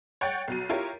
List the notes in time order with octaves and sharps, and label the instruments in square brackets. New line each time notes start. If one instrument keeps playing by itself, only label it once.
[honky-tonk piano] C#5 F#5 G5 C#6 A6
B1 F#3 D#7
E4 F4 G4 A#4 C#5